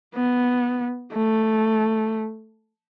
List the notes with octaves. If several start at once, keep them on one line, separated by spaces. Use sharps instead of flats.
B3
A3